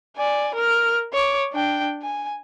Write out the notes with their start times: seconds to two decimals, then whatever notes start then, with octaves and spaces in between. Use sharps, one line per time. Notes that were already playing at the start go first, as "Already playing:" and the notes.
0.16 D5 G#5
0.55 A#4 F6
1.13 C#5 D6
1.53 D4 G5
2.02 G#5